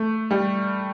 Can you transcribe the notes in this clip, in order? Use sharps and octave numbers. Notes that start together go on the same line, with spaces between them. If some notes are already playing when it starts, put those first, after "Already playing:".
Already playing: A3
G3